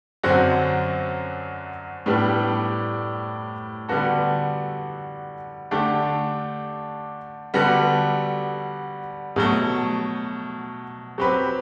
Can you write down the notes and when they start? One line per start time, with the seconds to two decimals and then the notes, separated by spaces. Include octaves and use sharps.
0.23 F#2 D3 F#3 C4 F#4
2.06 A2 G3 B3 D4 G4
3.89 D3 G3 B3 F#4 A4
5.71 D3 A3 D4 G4
7.54 D3 G3 B3 F#4 A4
9.36 B2 F#3 A3
11.18 F#3 C4 G4 B4